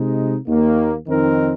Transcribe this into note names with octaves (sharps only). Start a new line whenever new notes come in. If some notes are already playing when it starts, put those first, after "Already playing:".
Already playing: C3 G#3 D#4
D#2 D#3 A#3
F2 D#3 C4 D#4 A#4